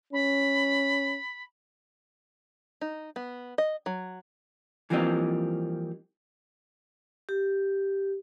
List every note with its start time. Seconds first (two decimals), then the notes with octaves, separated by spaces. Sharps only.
0.13 C#4 B5
2.81 D#4
3.16 B3
3.58 D#5
3.86 F#3
4.90 E3 F3 G3 A#3 C4 D#4
7.29 G4